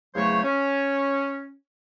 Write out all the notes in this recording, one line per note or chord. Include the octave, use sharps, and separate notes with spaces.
E2 C#3 F#3 A3 C5 C#5
C#4